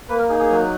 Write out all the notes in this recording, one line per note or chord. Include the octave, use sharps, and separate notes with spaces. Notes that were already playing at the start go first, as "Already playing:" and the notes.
A#3 B4
A#4
D#4 G#4
G#4
F#3